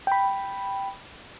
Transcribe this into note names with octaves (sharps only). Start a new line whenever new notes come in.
G5 B5